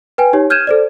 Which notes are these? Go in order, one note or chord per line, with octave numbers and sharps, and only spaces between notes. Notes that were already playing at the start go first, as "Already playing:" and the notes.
B4 G5 G#5
D#4 G4 C#5
F6 G6 G#6 D#7 E7
A4 C5 D5